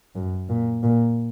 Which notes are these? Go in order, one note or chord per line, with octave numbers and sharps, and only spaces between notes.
F#2
A#2
A#2